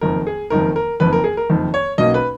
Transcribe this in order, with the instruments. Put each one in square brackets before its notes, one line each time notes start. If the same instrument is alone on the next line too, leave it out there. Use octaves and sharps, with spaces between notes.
[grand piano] F#1 F2 D#3 A#4
G#4
F#1 F2 D#3 A#4
A#4
F#1 F2 D#3 B4
A#4
G#4
A#4
F#1 F2 D#3
C#5
B1 B2 A#3 C#4 D#5
B4